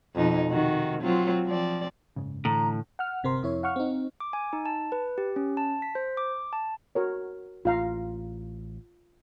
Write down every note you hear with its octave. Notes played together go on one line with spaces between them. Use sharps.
F2 B2 D#4
C3 D#3 F#4
F#3 C4 F4
F3 C4 D5
F#1 G#2 C#3
A2 D3 E3 A#5
F#5 F6
G1 C3 C4 A#4 C6
F2 E4 C#5
F5 F#5 C#6 F6
C4 D#4
D6
G#5
D#4
A5
B4
G4
C#4
A5
B6
C5
D6
A5
F#4 A#4 C#5
A1 F4 F5 A#5